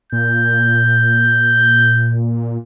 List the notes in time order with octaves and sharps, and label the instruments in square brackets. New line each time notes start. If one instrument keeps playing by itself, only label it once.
[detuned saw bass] A#2 [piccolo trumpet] G6